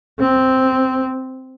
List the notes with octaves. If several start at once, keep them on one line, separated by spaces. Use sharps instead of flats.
C4